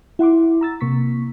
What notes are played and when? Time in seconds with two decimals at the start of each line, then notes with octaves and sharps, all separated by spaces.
0.19 E4 F#5 C6 D6
0.61 A#5 E6 A6
0.81 C3 A#3 C#6 B6